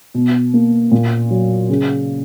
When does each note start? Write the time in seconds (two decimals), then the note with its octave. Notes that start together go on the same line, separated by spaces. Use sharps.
0.14 B2
0.54 A#3
0.92 A#2
1.30 F#3
1.70 C#3